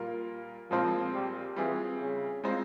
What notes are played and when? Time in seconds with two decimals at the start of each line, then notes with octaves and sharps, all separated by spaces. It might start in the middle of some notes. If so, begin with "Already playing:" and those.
Already playing: A#2 G3 A#3 F4 A#4
0.71 A#2 F3 G#3 C4 F4 C5
1.14 G3
1.56 E3 G3 C4 F4 G#4
2.00 C#3
2.44 G#3 C4 F4 C5